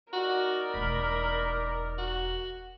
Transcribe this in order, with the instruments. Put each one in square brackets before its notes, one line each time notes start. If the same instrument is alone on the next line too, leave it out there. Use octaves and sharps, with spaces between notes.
[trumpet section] D#4 D5 A#5 [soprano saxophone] F#4 [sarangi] A#4
[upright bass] E1 A3 [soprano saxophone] B5
[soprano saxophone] F#4